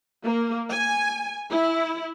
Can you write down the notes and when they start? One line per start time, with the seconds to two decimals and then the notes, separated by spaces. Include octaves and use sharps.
0.23 A#3
0.71 G#5
1.50 E4